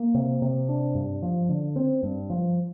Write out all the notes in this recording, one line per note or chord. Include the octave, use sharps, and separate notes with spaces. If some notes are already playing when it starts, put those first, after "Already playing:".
Already playing: A#3
C3
C3
D4
G2
F3
D3
C4
G2
F3